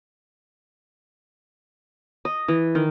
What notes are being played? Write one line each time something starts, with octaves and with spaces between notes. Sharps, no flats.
D#5
E3
D#3